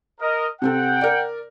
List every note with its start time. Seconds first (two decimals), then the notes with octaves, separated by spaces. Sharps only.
0.21 A#4 D#5
0.62 C3 C4 A4 F#5 G5
1.01 A#4 D5